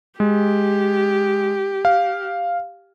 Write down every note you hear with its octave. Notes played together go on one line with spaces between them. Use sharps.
G#3 G4
F5